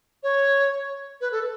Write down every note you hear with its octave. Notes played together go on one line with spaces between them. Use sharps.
C#5
B4
A4